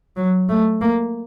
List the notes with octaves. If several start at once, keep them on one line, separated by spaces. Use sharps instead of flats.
F#3
A3
A#3